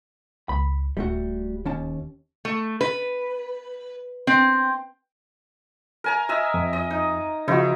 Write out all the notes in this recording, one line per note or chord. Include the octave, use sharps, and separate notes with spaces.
C#2 B5
D1 G3 A3 F#4
D#2 C#4 A5
A3
B4
C4
A#4 G#5 A#5
D#5 E5 G#5
F2
D#5
D#4
C#3 F3 D#4 E4 F#4